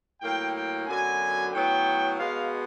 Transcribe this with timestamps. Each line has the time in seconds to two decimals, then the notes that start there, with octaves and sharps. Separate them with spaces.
0.21 A2 F#3 A#3 G5
0.54 G5
0.87 F#2 D3 F#3 B3 G#5
1.52 A2 F#3 B3 G5
2.17 B2 G#3 B3 F5